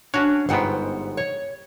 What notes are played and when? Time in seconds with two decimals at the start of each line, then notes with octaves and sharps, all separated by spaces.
0.14 C#4 D4 F#4 C#5
0.49 G1 G#2 B3 C5 F#5 G5
1.17 C#5